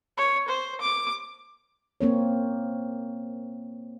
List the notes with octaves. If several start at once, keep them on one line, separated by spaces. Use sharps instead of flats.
C#5
C5
D6
A#3 C4 C#5